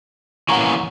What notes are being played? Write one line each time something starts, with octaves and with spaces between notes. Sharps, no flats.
E3 A#3 C#4 F#5 A#5 C#6